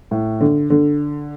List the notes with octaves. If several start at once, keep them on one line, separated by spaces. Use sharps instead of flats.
A2
D3
D3